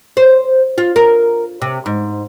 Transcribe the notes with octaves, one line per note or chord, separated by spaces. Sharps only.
C5
F4
A#4
C3
G#2